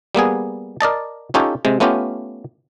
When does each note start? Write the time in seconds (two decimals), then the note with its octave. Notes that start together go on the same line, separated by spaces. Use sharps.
0.15 G3 A#3 B3 G#4
0.81 A#4 D5 D#5 A5
1.34 C#4 D#4 F4 G4 A4 C#5
1.65 C3 G#3
1.80 A3 B3 C#4 F4 G4